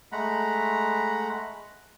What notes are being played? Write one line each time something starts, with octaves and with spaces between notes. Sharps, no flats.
G#3 A3 F#5 A#5 B5